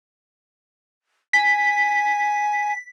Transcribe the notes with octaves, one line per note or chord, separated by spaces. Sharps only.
G#5 B6